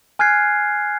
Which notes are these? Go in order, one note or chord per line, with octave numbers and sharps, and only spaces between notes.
G#5 F6 F#6 G#6 C7